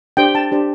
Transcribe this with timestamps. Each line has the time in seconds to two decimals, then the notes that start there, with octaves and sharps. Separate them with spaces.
0.17 D4 G4 C5 G5
0.35 A5
0.52 D4 G4 C5